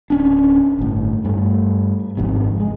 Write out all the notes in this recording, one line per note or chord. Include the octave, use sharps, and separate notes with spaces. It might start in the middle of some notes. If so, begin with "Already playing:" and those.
D1 C#4 D4
G1 A2
G2 A3
G#1 F2 G#2 C3
G#3